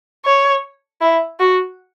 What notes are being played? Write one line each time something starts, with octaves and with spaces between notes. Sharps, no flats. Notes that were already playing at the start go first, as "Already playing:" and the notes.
C#5
E4
F#4